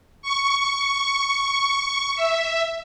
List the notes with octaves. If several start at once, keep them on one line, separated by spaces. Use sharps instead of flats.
C#6
E5